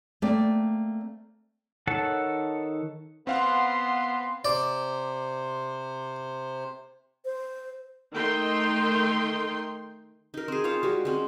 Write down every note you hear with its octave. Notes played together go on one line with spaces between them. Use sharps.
A3 A#3 C4 D5
D#3 A4 C#5 F#5 A5
B3 C4 F5 F#5 C6
C3 C5 D5
C5
D#3 A3 D#4 A#4 G5 C6
D#4 A#4
C4 G#4
F4 C5 C#5 F5
G3 G#3 F#4
G#3 C4 C#4